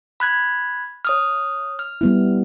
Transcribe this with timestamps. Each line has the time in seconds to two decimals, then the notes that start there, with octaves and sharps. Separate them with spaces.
0.20 B5 F#6 G#6
1.05 C#5 D#6 F6
1.79 F6
2.01 G3 B3 E4